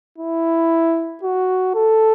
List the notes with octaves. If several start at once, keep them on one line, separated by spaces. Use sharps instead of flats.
E4
F#4
A4